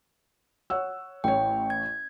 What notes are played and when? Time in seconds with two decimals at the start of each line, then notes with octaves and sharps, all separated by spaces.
0.70 C#5 F#5 E6
1.24 A1 C#5 G5
1.70 G#6